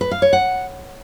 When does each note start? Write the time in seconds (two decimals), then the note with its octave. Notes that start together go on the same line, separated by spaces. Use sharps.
0.01 B4
0.11 F5
0.22 C#5
0.33 F#5